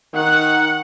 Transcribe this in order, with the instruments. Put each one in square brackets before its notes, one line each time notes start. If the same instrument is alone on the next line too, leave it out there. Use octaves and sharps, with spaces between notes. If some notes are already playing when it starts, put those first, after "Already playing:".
[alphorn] D#3 [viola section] F#5